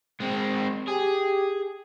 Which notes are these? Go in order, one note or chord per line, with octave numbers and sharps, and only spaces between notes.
G#3 C4
G4 G#4